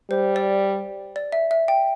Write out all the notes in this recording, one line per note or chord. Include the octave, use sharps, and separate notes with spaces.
G3 C5
D5
D5
E5
E5
G5